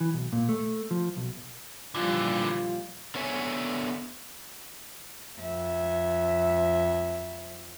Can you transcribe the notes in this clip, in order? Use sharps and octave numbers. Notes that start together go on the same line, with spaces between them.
E3
B1
A#2
A3
F3
B1
A#2 D3 E3 F3 G3 F4
D3 B3 C#5 E5 G#5
F2 E5